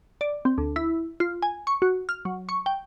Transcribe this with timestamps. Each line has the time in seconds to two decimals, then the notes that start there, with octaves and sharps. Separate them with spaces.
0.21 D5
0.45 C4
0.58 D2
0.76 E4
1.20 F4
1.42 G#5
1.67 C#6
1.82 F#4
2.09 F6
2.25 F#3
2.49 C#6
2.66 G5